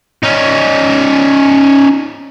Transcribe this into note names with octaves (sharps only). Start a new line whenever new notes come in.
C#4 D#4